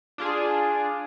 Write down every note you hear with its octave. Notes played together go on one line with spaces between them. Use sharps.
D4 F4 G#4